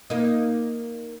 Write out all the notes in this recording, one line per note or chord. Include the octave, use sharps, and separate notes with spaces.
A#3 D#4